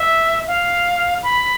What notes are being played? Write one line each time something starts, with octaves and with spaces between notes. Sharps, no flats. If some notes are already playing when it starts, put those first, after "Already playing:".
Already playing: E5
F5
B5